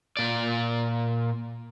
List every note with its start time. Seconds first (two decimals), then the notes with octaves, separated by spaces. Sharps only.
0.17 A#2 D5